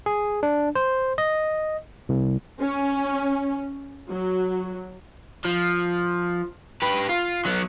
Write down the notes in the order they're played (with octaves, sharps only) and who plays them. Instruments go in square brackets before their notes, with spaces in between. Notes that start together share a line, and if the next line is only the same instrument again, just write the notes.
[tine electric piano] G#4
D4
C5
D#5
C2
[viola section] C#4
F#3
[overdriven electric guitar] F3
G4 B4
F4
F#3 B3